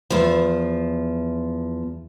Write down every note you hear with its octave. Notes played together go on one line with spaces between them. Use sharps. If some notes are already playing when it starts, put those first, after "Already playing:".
E2 F3